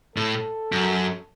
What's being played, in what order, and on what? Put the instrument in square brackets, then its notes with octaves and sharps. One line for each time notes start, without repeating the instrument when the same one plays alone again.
[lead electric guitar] A2 [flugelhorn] A4
[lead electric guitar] F#2